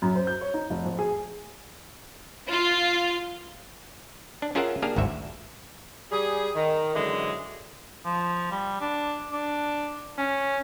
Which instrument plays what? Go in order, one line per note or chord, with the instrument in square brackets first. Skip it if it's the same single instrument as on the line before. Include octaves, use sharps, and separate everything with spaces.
[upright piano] F#2
C5
G6
C#5
D#4
F1
F2
G#4
[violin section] F4
[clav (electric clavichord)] D4
C#4 F4 G#4 A#4 E5 F#5
A#3 D4 G4 G#4 F5
G#1 D2 G#2 F#4 E5
[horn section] G3 G#4
D#3
F#2 D3 E3 G#3
[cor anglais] F3
G3
D4
D4
C#4